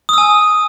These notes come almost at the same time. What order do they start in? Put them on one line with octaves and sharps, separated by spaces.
D#6 E6 G#5